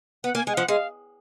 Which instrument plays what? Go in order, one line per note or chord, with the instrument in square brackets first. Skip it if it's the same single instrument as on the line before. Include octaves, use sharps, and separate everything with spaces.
[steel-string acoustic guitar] B3 [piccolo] F#5
[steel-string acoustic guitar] A#3 [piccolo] G#5
[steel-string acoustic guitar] G#3 [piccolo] G#5
[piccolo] F5
[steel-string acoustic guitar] F3 [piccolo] F#5
[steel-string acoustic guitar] G#3 [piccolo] F5